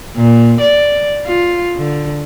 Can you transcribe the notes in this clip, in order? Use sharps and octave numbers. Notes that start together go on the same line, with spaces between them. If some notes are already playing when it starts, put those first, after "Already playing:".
A#2
D5
F4
D3